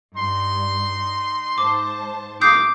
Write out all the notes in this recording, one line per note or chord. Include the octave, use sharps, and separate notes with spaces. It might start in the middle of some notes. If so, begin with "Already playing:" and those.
G2 D#4 C6
G#2 C5 A5 D6
C4 G4 F5 D6 D#6 G6 C7